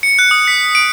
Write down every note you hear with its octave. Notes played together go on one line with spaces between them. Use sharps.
C#7
F#6
D#6
B6
D7